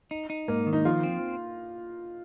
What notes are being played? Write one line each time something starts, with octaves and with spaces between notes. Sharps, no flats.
D#4
D#4
G#2 A#3
D#3
D#4
F3 F4
C4